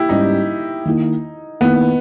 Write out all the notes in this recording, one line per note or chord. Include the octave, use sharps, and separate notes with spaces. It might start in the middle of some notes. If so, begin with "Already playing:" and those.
Already playing: E4 G4
G#2 G3 C#4 D#4
D#3 A#3 E4
D#3 A#3 B3 E4